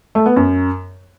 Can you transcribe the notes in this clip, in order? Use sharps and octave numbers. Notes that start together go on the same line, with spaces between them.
A3
B3
F#2